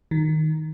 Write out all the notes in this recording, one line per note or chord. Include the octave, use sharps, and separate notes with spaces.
D#3